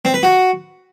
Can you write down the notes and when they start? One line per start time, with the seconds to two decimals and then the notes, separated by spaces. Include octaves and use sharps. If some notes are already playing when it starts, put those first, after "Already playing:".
0.05 C4
0.14 B4
0.23 F#4